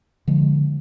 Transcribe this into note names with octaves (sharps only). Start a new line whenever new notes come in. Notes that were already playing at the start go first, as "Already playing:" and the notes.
D3 F3 G#3